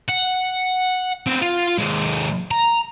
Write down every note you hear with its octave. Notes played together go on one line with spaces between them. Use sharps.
F#5
B3 C4
F4
D#2 G#3
A#5